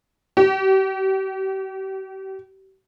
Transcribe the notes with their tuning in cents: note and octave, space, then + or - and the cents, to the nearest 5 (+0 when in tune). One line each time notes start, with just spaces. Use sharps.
G4 -40